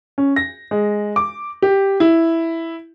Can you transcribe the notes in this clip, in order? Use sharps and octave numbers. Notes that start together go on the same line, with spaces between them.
C#4
A#6
G#3
D6
G4
E4